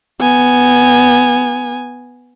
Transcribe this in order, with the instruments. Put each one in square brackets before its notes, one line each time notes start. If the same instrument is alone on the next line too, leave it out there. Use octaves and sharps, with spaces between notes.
[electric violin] B3 G#5